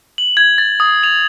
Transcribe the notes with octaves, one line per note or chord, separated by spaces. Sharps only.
F#7
G#6
A6
D#6
F7